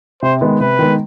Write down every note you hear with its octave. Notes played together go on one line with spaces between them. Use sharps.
C3 C5
D#3 G#3 B3
C3 B4
D#3 G#3 B3